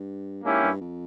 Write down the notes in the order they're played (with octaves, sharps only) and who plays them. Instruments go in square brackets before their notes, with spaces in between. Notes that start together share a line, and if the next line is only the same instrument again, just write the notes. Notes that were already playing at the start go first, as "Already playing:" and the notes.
Already playing: [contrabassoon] G2
[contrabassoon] G#2 [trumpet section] A#3 C#4 E4 G4
[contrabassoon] G2
F2